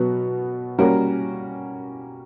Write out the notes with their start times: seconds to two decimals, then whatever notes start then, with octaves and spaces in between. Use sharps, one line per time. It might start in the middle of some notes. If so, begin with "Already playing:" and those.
Already playing: B2 F#3 B3 F#4 B4
0.78 G3 A#3 C#4 F#4 A#4